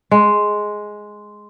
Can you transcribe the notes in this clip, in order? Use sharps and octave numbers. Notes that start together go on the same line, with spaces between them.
G#3